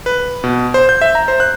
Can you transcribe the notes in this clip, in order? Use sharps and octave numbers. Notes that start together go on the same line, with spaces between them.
B4
B2
C5
G6
E5
A#5
C5
F#6